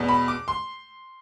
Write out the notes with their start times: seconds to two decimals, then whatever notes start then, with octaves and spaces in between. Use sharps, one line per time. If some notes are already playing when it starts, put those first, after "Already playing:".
Already playing: E2 B2
0.08 B5
0.28 D6
0.48 C6